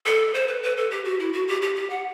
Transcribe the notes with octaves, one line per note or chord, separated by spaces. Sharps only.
A4
C5
B4
B4
A4
G4
F#4
E4
F#4
G4
G4
G4
F#5